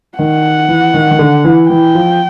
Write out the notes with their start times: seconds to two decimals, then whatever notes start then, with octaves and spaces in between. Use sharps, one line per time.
0.18 D#3 F#5
0.68 E3
0.94 D#3
1.11 D#3
1.19 D3
1.44 E3
1.69 E3 G5
1.95 F3